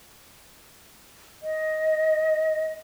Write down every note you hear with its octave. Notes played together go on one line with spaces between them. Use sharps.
D#5